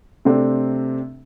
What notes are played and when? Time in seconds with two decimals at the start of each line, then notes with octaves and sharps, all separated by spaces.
0.25 C3 A3 C4 D4